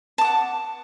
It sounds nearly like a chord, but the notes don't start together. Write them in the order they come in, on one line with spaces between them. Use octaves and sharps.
A5 D6 F#5